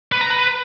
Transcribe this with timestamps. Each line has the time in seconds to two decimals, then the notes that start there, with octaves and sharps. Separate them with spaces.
0.12 B4
0.21 A#5
0.30 B4